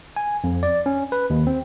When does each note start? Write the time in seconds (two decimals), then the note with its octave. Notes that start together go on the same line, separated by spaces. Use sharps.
0.16 G#5
0.44 F2
0.63 D5
0.86 C#4
1.12 B4
1.30 D#2
1.47 C4